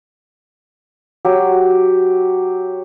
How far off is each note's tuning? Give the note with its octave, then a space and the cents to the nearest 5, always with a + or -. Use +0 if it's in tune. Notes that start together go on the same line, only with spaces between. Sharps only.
F#3 +0 G4 +0